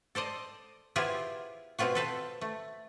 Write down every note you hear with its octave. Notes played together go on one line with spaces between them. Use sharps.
A4 C5 D5 D#5
B3 E4 F4 G4 G#4 C5
B2 B3 C4 F4 F#4
A4 B4 C5
A3